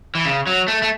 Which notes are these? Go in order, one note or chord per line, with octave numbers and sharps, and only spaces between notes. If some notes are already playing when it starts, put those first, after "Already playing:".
E3
C#3
F#3
A3
A3